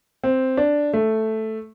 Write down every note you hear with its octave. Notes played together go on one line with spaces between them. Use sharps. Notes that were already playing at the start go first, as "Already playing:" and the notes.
C4
D4
A3